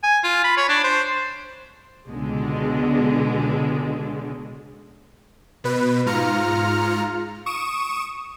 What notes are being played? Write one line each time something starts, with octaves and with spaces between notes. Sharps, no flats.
G#5
F4
B5
C#5
D4
C5
C#2 B2 D3 G#3
B2 B4
G#2 F4 A#5 F6 C#7
C#6 D#6 D7 E7